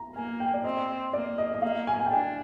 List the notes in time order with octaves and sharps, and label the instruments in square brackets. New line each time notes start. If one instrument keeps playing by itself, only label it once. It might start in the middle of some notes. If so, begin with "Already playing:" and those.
Already playing: [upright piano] A#5
[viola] A#3 [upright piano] G#5
[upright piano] G5
D5
[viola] C4 [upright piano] D#5
[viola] A#3 [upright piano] D5
[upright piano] D#5
D#5
[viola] A#3 [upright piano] F5
[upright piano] G#5
G#5
G5
[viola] D4 [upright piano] G#5